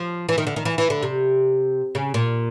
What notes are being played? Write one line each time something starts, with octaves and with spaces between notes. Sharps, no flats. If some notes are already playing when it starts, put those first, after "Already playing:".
Already playing: F3
E3
D#3
D3
D#3
E3
E3
D3
C3
C#3
A#2